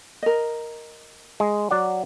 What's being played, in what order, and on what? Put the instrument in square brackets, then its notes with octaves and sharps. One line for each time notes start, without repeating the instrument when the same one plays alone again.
[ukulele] A#4 D#5
[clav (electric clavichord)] G#3
F#3 D5 F#5